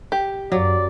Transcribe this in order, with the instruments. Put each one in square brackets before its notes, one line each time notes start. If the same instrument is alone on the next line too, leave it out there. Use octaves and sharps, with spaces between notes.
[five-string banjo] G4
[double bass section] F#2 [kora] F#3 [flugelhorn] D5